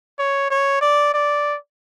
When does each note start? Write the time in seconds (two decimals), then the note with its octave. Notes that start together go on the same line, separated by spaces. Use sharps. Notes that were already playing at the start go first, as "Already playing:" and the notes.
0.19 C#5
0.50 C#5
0.81 D5
1.14 D5